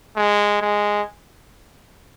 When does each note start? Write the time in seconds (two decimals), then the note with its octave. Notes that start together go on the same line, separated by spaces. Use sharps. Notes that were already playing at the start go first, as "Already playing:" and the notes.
0.16 G#3
0.61 G#3